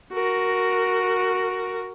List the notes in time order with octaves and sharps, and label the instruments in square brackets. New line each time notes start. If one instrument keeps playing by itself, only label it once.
[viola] F#4 A#4